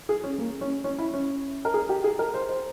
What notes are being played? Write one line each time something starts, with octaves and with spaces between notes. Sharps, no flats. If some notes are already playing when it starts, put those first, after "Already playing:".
G#4
C#4
A#3
C#4
C#4
E4
C#4
A#4
G#4
G4
G#4
A#4
C5
C5